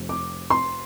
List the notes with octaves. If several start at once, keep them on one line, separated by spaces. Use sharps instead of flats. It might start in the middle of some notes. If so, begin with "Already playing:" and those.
Already playing: F1 F2 C3
D6
C6